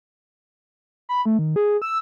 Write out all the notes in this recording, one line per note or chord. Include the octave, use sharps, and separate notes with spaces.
B5
A3
D#3
G#4
E6